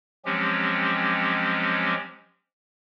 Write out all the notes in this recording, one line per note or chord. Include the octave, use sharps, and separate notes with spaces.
F3 F#3 G#3 C4 C#4 G4